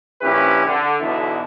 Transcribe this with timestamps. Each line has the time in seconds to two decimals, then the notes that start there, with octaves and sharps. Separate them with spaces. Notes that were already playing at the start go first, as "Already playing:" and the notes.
0.22 A#1 C#4 E4 G4 B4
0.66 D3
1.01 B1 E2 B2 D3 E4